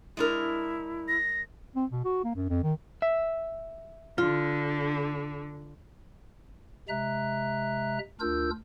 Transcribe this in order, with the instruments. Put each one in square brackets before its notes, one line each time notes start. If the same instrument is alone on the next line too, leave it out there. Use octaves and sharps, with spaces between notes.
[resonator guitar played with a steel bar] G#3 D4 A#4 [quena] E4
[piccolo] A#6
[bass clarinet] C4
B2
F#4
A#3
F#2
F2
D#3
[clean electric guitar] E5
[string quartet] D3 [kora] F4
[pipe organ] C3 G#3 E5 A#5 F#6
D2 D4 F4 A#4 E6 G6